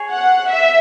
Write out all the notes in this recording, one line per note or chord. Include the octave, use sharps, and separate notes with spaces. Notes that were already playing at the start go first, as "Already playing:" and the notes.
Already playing: G#4 C#5 G#5
F#5
E5